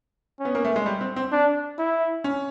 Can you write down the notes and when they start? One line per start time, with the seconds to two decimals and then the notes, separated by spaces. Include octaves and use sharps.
0.40 C#4
0.45 B3
0.55 A#3
0.65 A3
0.76 G#3
0.86 G3
1.01 C4
1.16 C4
1.32 D4
1.79 E4
2.24 C#4